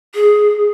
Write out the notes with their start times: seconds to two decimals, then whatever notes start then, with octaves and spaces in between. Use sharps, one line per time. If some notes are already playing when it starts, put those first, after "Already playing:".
0.15 G#4